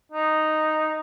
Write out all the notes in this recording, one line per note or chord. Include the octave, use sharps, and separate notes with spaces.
D#4